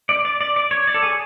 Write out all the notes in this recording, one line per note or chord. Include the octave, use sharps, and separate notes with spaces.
D5
D5
D5
D5
C#5
D5
A4
G#4